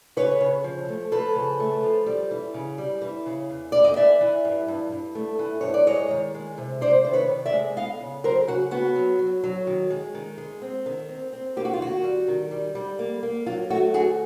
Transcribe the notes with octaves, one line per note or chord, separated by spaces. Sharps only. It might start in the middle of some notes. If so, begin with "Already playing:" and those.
C#3 B4 C#5
C#3
F3
A3
F3 A4 B4
C#3
A3
F3
G3
E3
C#3
G3
E3
C#3
E2
E2 D5
D#5
E3 D5 E5
E3
G2
G2
G2
A3
E3
G2 C#5
D5
G#3 C#5 D#5
D#3
G#3
C3
C3 C5 D5
D#3 C5
B4 C#5
C3
D5 E5
G#3
B3 D#5 F5
C#3
F#3 A#4 C5
C#3 F#4
B3 F#4
F#3
F#3
F#3
D#3
G#3
D#3
G#3
C4
D#3
C4
C4
A#3 G4
F#4
F4
D#3 F#4
G3
D#3
G3
G3
A#3
A#3
F#3 F4
A3 F#4
D2 F#4 G#4